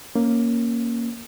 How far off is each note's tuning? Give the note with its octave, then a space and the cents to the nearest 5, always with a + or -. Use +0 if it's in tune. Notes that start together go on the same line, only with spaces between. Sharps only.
A#3 +0 C#4 +0